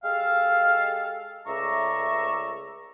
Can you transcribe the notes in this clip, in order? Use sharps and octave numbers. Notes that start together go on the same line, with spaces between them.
G#3 G4 A4 F5
C#2 A3 D5 E5 A#5 C#6